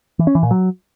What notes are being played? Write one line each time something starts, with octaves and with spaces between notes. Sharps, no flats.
E3
C#4
E3
A#2
F#3